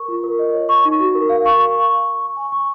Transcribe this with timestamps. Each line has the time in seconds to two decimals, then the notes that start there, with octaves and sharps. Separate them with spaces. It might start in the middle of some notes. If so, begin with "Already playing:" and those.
Already playing: A#4 C#6
0.08 F4
0.24 A#4
0.39 D#5
0.54 C#5
0.69 C#6
0.85 D#4
1.00 F#4
1.15 A#4
1.29 F5
1.45 C#6
1.60 C#6
1.76 C#6
1.91 C#6
2.06 C#6
2.21 C#6
2.37 G#5
2.52 C#6